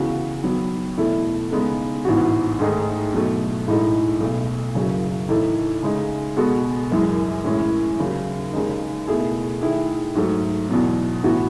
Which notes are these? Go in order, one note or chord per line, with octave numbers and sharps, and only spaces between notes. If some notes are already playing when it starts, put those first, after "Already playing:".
Already playing: C#2 C#3 E3 B3 F#4
D#3 F#3 B3
E2 B2 A3 E4 A4
C#3 G#3 B3 D#4 A4
A1 G#2 E3 B3 F#4
G#2 D#3 A3 D#4 G#4
B2 F#3 A3
A1 A2 G#3 D#4 A4
B1 B2 A3
F#1 F#2 C#3 F#3
A2 E3 A3 D#4 A4
C#3 G#3 D#4
B2 G#3 B3 F#4 A4
F#1 F#2 E3 G#3
A2 E3 G#3 C#4 E4
D#2 C#3 F#3
D#2 C#3 G#3 D#4
B2 A3 E4 G#4
D#3 A3 E4 G#4
G#2 F#3 A3
E2 B2 F#3
A2 E3 B3 F#4